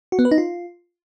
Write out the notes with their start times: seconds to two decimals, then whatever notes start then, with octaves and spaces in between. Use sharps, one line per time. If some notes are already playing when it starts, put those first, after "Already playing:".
0.12 F#4
0.19 B3
0.25 B4
0.31 D#4
0.38 F4